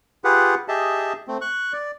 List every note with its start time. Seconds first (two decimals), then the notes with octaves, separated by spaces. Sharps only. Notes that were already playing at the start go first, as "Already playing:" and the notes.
0.24 F4 G4 G#4 B4 F#5
0.68 G4 G#4 D#5 E5 A5
1.27 A3 C4
1.41 C#6 F#6
1.73 D5